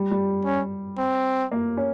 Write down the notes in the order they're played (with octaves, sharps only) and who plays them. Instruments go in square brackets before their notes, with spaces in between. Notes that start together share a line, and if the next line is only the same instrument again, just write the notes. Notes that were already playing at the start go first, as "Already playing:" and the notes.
Already playing: [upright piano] G3
G3
[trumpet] C#4
C4
[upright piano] A#3
C#4